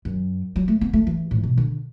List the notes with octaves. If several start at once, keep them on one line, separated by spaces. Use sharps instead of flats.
F#2
F#3
A3
B3
A3
E3
A2
B2
D3